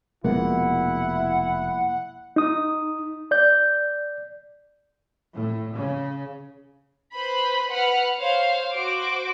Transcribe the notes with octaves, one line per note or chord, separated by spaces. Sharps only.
F1 B2 F3 G#3 A#3 E4 F#5
D#4 D#6
D5 G6
A2
C#3
B4 C5 B5
B4 F#5 B5 F6
C5 C#5 F5
F#4 C5 D6